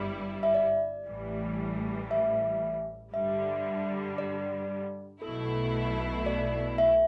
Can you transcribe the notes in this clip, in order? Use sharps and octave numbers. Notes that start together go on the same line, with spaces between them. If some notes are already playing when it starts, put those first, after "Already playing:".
Already playing: G1 G2 G3 E4
E5
D5
A1 A2 E3 G3
E5
G2 D3 G3 E5
D5
B1 B2 A3 E4 A4
D5
E5